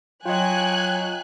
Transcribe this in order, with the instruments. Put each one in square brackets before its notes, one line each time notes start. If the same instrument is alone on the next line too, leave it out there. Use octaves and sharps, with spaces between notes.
[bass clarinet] F#3 [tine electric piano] F4 D#5 [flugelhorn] G5 [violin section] G#5 F#6